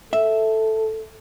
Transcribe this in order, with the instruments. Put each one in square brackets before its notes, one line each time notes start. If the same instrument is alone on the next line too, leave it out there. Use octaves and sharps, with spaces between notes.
[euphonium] A4 [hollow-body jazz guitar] E5